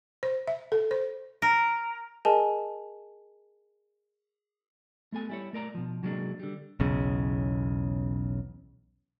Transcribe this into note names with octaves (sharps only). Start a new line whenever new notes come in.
C5
E5
A4
C5
A#4
G#4 A#4 D#5 G#5 A5
A3 B3 A4 G#5
G3 E4 C#5
A3 A#4 D5 A#5
B2 F3
C3 F#3 G#3 A#3 D4
D3 G3
B1 E2 C#3